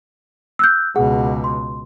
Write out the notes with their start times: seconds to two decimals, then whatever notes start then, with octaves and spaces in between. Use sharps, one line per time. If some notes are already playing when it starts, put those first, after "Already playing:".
0.59 E6 F#6 G6
0.96 C#2 B2 G#4 F#5
1.44 C6